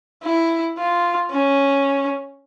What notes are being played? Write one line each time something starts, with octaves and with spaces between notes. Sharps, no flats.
E4
F4
C#4